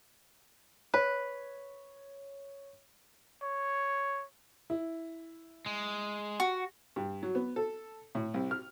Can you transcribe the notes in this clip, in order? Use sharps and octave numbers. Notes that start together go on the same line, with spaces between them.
B4 C#5
C#5
E4
G#3
F#4
G2
F#3
B3
A4
A2
C2
F6